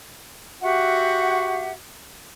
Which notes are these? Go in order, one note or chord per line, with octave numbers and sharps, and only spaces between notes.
F#4 G4 E5 F#5